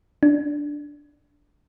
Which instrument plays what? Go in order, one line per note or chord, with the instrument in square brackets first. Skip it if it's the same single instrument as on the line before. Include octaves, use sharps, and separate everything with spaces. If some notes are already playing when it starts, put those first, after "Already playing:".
[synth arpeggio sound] D4